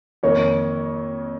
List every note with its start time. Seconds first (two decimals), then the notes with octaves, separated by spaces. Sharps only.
0.23 F2 D#3 A#3 C#5